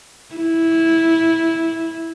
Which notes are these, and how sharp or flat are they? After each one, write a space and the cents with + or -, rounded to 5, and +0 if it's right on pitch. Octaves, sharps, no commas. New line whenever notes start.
E4 -10